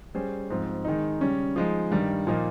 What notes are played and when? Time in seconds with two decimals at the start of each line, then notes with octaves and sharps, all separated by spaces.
0.15 G3 C#4 G#4 C5
0.50 G#2 F3 C4
0.85 D#3 G#3 D#4
1.21 C#3 G3 C#4
1.56 F3 G#3 D#4
1.91 G2 D#3 G3
2.27 A#2 F3 A#3 D#4